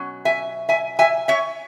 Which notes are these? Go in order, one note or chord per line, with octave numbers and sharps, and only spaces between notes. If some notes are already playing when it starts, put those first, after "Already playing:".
Already playing: B2 F#3 C#4
E5 G#5
E5 G#5
E5 G#5
C#5 E5